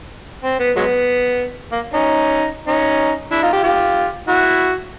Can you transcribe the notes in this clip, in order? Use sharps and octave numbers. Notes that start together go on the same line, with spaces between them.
C4
B3
F#3 G#3 B3
A#3
C#4 D#4
C#4 D#4
D4 E4
D#4 F4
F4 G4
F4 G4
E4 F#4